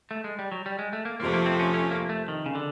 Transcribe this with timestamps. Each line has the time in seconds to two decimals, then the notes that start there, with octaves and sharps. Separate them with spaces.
0.11 A3
0.24 G#3
0.39 G3
0.52 F#3
0.66 G3
0.79 G#3
0.93 A3
1.05 A#3
1.19 F2 C3 F3 A3 A#3
1.34 A#3
1.46 C4
1.60 C#4
1.74 C#4
1.91 A#3
2.09 A3
2.28 D#3
2.46 C#3
2.55 D3